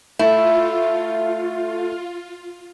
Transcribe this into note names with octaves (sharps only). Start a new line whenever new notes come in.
A3 E4 F4